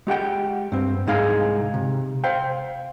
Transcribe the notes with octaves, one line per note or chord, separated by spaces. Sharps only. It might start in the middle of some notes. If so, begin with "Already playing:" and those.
G#3 G4 F#5 G5
G2 C4
C2 G#2 G#3 D#4 G#4 F5
C3
C5 F5 G5